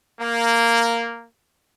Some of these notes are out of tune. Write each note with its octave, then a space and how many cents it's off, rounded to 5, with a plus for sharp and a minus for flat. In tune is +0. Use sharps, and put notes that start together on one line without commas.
A#3 -5